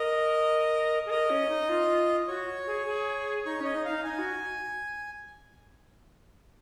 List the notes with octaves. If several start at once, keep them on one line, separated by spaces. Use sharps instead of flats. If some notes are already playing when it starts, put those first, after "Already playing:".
Already playing: A#4 D#5
G#4
A#4 D#5
C#4
D#4
F4
F#4 C#5
G#4
G#4
D#4 C#5
C#4 D#5
D#4
D#4 F5
D#4 G#5
F#4